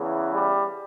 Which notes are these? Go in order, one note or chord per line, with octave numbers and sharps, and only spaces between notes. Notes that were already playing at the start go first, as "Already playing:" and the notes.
Already playing: E2 C#3 E3
G3